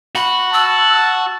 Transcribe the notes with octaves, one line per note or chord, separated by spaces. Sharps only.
F#4 B5
A5 E6